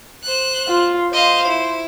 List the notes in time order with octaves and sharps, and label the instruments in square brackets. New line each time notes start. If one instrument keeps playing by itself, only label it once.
[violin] C5 F#6
[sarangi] F4
[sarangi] C5 [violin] D#5 F5
[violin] E4